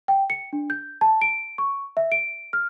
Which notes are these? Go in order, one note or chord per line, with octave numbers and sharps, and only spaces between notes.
G5
C#7
D4
G6
A5
D7
C#6
E5
D7
F6